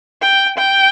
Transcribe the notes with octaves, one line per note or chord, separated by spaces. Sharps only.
G5
G5